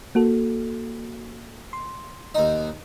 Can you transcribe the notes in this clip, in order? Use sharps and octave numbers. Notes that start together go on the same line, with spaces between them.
A#3 F#4 A4
C6
D#2 D#4